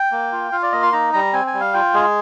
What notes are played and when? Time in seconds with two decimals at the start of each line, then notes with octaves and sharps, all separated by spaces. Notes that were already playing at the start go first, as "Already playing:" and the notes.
Already playing: G5
0.12 A#3
0.32 F4
0.52 F4 F5
0.62 D5
0.72 A#3 D#5
0.83 C6
0.92 D#4 A#5
1.13 G3 A#5
1.33 C4 G#5
1.47 G#5
1.54 G3
1.60 F5
1.74 F4 G5
1.94 G#3 G#4